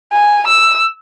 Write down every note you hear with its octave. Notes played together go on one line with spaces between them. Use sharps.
G#5
E6